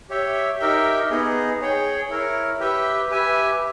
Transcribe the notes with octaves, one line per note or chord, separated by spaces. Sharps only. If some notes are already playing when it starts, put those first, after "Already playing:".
G4 C#5 E5 G5
D#4 G4 A#4 E5 G5
B3 D#4 G#4 D#5
G#4 C#5 G5
E4 A#4 C#5
G4 B4 E5 G5
G4 B4 E5 G#5